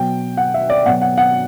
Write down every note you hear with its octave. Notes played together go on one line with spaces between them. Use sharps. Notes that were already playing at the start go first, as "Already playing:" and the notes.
Already playing: B2 F#3 G5
F#5
E5
D5
B2 F#3 F#5
F#5
F#5